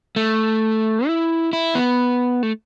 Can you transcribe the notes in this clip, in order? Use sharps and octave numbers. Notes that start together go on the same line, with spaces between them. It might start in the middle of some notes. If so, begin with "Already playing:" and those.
A3
E4
E4
B3
A3